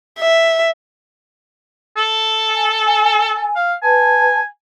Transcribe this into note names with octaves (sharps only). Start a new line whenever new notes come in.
E5
A4
G#5
F5
B4 G#5 A5